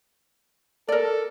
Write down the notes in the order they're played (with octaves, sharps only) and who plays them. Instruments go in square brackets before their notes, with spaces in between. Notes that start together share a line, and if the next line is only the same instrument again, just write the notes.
[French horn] A4 [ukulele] A#4 D5